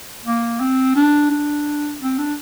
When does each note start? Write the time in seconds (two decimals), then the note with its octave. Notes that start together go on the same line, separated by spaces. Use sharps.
0.25 A#3
0.60 C4
0.96 D4
1.31 D4
2.01 C4
2.18 D4